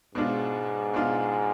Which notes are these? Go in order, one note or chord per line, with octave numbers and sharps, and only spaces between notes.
G#2 B2 G#3 D4 F4
B2 G#3 D4 F4